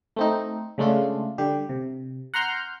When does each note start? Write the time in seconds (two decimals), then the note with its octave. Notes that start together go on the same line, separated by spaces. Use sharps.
0.16 A3 C4 D#4
0.78 C#3 G#3 A3 D4 F4
1.38 D3 G3 G4
1.69 C3
2.34 F#5 A#5 C6 F6 G6